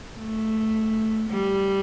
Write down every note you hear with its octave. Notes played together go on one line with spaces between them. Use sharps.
A3
G3